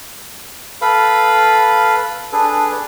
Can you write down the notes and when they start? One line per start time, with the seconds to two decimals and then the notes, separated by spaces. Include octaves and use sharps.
0.81 A4 B4 F5 B5
2.33 D4 G#4 A4 B4